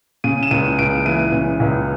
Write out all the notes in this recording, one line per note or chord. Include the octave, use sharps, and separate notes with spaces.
C#3 D#7
E7
C#2 D#7
C#2 D7
E3 D#7
C#3
C#2